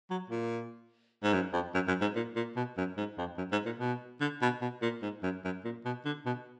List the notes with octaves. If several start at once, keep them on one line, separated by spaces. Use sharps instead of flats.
F#3
A#2
G#2
F#2
F2
F#2
F#2
G#2
A#2
A#2
B2
F#2
G#2
F2
F#2
G#2
A#2
B2
D3
B2
B2
A#2
G#2
F#2
F#2
A#2
B2
D3
B2